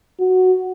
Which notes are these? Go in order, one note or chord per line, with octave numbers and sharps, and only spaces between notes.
F#4